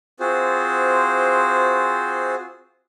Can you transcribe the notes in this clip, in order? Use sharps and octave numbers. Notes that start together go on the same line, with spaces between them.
C4 F4 F#4 G#4 C5